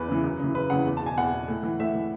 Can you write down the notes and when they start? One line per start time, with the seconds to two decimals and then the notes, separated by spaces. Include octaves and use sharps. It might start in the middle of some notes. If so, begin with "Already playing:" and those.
Already playing: E2 B4
0.08 C#3 E3
0.24 F#2
0.39 C#3 E3
0.54 F#2 B4
0.70 C#3 E3 F#5
0.86 E2
0.97 A5
1.02 B2 G#5
1.17 E2 F#5
1.33 B2
1.48 A2
1.63 E3
1.80 A2 E5
1.95 E3